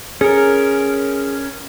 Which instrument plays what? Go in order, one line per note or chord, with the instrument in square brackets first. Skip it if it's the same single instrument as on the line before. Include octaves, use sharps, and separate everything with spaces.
[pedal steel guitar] C#4 A#4 [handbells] G#4